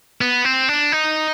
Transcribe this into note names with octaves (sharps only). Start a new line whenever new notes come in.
B3
C4
D4
D#4